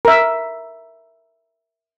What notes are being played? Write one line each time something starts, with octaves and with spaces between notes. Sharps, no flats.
A#4 E5